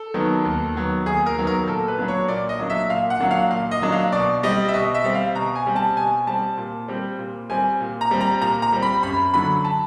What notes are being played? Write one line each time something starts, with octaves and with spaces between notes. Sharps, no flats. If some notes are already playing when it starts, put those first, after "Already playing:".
Already playing: A4
D#3 F#3 B3
D#2
D#3 F#3 B3
D#2 G#4
A#4
D#3 F#3 B3
A#4
A#2 A4
B4
F#3 A#3 D4
C#5
A#2 D5
D#5
F#3 A#3 D4
E5
A#2 F5
F#5
F#3 A#3 D4
F5
A#2 F5
D#5
F#3 A#3 D4
F5
B2 D5
G3 C4 D#5
E5
B2 D#5
E5
G3 C4
F5
B2 A#5
G#5
G3 C4
A5
B2 G#5
G3 C4 A5
A#2
G3 C4
A#2
G3 C4 G#5
A#2
A#5
G3 C4
A#5
A#2 A#5
A#5
G3 C4
B5
F#2 B5
D3 F#3 B5
A5